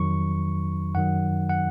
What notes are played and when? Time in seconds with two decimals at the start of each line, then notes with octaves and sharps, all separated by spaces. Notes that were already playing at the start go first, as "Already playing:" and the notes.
Already playing: F2 D#3 F#3 C#6
0.95 F#2 D#3 F#3 F#5
1.49 F#5